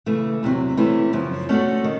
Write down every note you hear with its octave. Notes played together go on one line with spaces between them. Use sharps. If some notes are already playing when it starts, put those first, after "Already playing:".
C#3 E3 A3
E2 C3 D#3 F#3
C3 E3 A3 C#4 E4
F#2 C#3 F3
A3 C#4 F#4 A4 D5
D#3